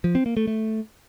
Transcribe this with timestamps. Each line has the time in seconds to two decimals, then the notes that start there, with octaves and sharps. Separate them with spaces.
0.04 F3
0.15 C4
0.26 A#3
0.37 A3
0.47 A3